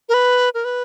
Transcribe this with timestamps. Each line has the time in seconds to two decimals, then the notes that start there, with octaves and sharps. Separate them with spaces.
0.09 A#4
0.14 B4
0.54 A#4
0.65 B4